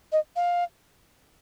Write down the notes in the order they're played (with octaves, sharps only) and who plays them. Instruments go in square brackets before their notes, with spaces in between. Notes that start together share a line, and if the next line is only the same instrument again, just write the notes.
[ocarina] D#5
F5